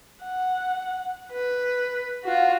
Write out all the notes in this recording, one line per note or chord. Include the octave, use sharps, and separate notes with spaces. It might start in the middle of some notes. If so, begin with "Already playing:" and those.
F#5
B4
F4 F#4